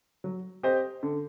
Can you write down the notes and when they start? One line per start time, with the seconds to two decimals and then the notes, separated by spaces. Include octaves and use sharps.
0.24 F#3
0.63 C4 G4 C5 D#5
1.03 D3